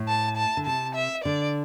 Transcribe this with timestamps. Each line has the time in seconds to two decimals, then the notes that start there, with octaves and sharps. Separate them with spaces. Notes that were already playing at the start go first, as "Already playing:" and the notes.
Already playing: A2
0.08 A5
0.37 A5
0.57 D3
0.66 C3 A5
0.95 E5
1.25 D3 D5